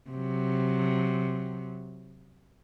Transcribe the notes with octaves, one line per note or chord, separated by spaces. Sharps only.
C3 F#3